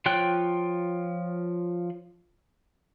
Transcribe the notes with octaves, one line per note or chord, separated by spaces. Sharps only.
F3 F4 C#5 G5 F#6